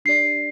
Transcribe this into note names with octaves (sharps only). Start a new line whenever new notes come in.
D4 G4 D5 C7